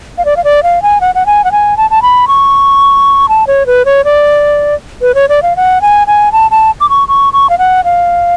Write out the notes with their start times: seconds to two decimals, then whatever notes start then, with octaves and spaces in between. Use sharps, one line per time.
0.18 F5
0.25 D5
0.37 F5
0.44 D5
0.63 F5
0.82 G#5
1.01 F#5
1.15 F#5
1.26 G#5
1.44 F#5
1.52 G#5
1.77 A5
1.90 A5
2.02 B5
2.28 C#6
3.29 A5
3.47 C#5
3.67 B4
3.85 C#5
4.05 D5
5.02 B4
5.15 C#5
5.29 D5
5.43 F5
5.56 F#5
5.82 G#5
6.07 G#5
6.32 A5
6.51 A5
6.81 D6
6.90 C#6
7.08 C#6
7.33 C#6
7.50 F5
7.58 F#5
7.84 F5